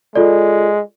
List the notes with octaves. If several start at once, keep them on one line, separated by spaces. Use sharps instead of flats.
G#3 F4 A4 D5